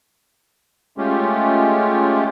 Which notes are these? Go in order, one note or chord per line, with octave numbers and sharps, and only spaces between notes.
G#3 A3 C#4 F4 G4